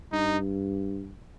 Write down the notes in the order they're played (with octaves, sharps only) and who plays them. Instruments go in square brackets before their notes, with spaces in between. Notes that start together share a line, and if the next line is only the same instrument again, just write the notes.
[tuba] G2 [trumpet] D#4